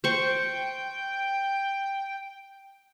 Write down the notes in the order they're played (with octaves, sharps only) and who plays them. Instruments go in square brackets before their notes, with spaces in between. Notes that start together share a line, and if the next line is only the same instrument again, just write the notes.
[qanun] C5 C#6 [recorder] G5